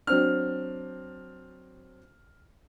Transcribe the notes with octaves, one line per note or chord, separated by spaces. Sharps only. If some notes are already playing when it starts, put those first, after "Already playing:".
F#3 C4 D4 F6